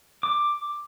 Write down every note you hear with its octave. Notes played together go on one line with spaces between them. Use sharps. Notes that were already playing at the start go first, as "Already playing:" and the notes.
D6